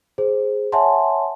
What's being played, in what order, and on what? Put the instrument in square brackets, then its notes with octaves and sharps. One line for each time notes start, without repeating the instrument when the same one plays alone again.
[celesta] G#4 C5
C#5 E5 F#5 G#5 A5 C6